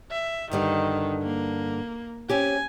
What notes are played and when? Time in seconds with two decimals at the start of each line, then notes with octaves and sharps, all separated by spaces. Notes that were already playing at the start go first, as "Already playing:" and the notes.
0.11 E5
0.51 G2 D3 D#3 G3
1.23 A#3
2.29 C4 C#4 G4 G#5